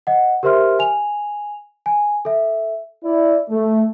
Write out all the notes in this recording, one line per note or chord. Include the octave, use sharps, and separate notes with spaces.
D#5 F#5
G4 A#4 C5 E5 C6 F6
G#5 F7
G#5
A4 E5
E4 D5
A3